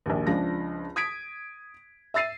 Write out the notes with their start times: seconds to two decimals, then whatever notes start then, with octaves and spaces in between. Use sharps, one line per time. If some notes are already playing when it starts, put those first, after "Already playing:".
0.06 A#1 D#2
0.27 C#2 F3 D4 A#6
0.96 D#6 G#6 B6 D7
2.14 E5 E6 A6 C7 D#7